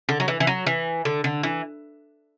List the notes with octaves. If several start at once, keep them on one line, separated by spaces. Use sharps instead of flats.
D3
F#3
E3
E3
F#3
E3
D3
D3
E3